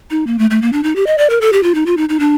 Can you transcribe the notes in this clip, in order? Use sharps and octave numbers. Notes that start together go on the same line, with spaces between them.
D#4
A#3
A3
A3
A#3
D4
D#4
G4
D#5
D5
A#4
A4
G4
F4
D#4
F4
D#4
D#4
D4